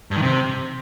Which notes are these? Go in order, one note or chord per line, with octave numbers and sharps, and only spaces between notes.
G2
D#3
C3